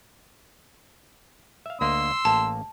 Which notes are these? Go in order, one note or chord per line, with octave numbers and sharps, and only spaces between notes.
E5 F5
D2 A#3 D#5 C6 E6
A1 A#3 A5